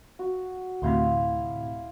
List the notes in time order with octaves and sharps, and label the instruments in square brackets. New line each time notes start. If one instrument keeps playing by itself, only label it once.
[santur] F#4
[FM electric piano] D2 A2 C3 [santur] E4 F5 C6